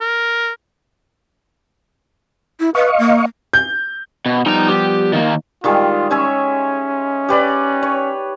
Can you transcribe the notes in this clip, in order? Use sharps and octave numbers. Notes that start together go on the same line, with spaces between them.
A#4
E4
B4 D#5 F5 C#6
A#3
G6
B2
F3 G3 B3 D#4 A#5
G4
D#3 A#3
D#3 G3 G#3 F4
C#4 C#5 E5 G#5
G4 B4 D5
C#5